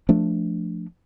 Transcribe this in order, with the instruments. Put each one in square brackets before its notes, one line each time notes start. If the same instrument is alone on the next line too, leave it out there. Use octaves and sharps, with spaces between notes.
[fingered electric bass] F3 A3 D4